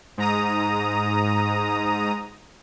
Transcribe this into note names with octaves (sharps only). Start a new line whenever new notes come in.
G#2 A#5 D#6